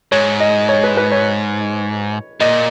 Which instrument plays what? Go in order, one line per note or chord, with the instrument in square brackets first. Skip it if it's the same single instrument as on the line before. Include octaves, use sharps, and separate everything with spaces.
[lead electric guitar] G#2 [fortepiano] C#5
[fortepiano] D#5
C#5
B4
B4
C#5
[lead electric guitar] A#2 [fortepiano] D#5